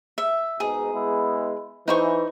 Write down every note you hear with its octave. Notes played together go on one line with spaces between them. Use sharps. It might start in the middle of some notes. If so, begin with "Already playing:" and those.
E5
G#2 B2 D#4 G#4
G#3 B3 E4
E3 D#4 C5 C#6